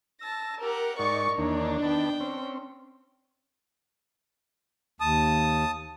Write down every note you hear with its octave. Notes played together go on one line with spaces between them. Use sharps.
A5 E6 A#6
G4 A#4 F#5
G#2 D#4 A#4 D5 C#6
E2 D#3 A#3 D4 C#5
D#3 B3 G5 A5
C4 C#4
D#2 A5 D#6